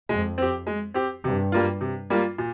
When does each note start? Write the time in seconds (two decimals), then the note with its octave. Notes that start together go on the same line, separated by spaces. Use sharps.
0.09 F2 G#3
0.38 C4 G4
0.67 G#3
0.94 C4 G4
1.24 G2 C3
1.52 G3 A#3 F4
1.81 C3
2.10 G3 A#3 F4
2.38 A#2